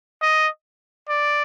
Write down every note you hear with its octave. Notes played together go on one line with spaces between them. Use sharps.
D#5
D5